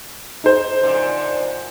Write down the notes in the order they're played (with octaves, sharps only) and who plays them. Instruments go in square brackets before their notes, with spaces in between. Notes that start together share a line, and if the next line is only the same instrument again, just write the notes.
[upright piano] D#4 C5
[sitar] F#2 A#2 D3